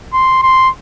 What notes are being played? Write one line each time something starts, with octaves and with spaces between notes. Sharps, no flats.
C6
C6